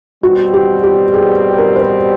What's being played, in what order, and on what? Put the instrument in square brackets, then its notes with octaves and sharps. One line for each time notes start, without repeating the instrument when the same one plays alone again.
[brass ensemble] B2 G3 C4 [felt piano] F#4
[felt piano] G4
G4
G#4
A#4
C5
B4